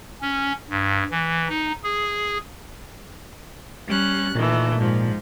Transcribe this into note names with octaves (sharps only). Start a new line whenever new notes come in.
C#4
G2
E3
D#4
G#4
G3 C#4 F#6
A#2 D#3 E3 A3
G#2 F3